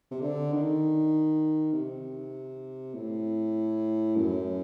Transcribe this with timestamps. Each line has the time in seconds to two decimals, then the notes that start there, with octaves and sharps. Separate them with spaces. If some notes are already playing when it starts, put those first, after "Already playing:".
0.11 C3
0.22 D3
0.53 D#3
1.73 C3
2.94 A2
4.16 F#2